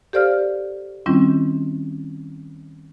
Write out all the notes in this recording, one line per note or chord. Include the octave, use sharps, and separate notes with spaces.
G4 A4 C5 D5 F5 F6
D#3 G3 C4 C#4 E4 F4